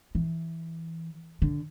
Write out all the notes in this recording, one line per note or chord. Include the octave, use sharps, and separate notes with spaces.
E3
D3